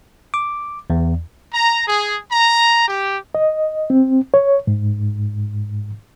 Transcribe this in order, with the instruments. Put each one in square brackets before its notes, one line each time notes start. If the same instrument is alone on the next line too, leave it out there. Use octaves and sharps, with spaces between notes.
[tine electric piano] D6
E2
[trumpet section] A#5
G#4
A#5
G4
[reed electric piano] D#5
C4
C#5
G#2